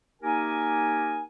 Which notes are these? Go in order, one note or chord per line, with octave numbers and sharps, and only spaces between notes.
A#3 D#4 G4 A#4 G#5